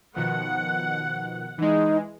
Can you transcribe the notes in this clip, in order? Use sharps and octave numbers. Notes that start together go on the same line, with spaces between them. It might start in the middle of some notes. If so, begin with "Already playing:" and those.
B2 D#3 F3 F#5
E3 G#3 D#4